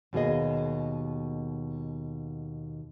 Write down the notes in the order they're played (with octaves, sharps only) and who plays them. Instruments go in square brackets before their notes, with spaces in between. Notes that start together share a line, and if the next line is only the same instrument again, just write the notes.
[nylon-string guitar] D#2 B2 A#3 G#4 D#5